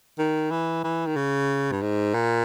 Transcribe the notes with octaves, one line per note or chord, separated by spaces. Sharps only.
D#3
E3
E3
D#3
C#3
G2
G#2
A#2